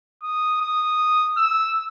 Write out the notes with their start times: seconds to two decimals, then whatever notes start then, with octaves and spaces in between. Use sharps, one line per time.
0.23 D#6
0.61 D#6
1.37 E6